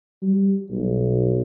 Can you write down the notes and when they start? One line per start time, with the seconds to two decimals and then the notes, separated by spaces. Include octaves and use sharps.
0.22 G3
0.71 B1